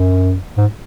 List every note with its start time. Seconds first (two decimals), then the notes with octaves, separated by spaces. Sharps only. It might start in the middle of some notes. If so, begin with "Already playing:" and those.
Already playing: F#2
0.57 G#2